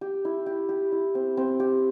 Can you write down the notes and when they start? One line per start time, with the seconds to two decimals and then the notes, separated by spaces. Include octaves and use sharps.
0.01 G4
0.25 E4
0.46 G4
0.69 G4
0.92 E4
1.15 C4
1.37 C4
1.60 G4